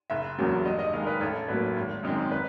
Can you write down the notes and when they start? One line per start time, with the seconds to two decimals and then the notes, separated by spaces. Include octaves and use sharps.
0.10 F#1 E5
0.38 E2 C#3 F#3 A#3
0.65 G2 D#5
0.79 D#5
0.93 D#3 G#3 F5
1.03 A#4
1.07 B4
1.21 A1 A4
1.48 A2 F#3 A#3 B4
1.77 G#1
2.03 F#2 D#3 G#3 C4
2.32 B4